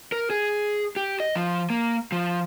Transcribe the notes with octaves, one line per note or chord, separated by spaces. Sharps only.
A#4
G#4
G4
D#5
F3
A#3
F3